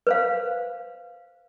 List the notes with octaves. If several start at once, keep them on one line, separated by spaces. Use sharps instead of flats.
B4 C5 F5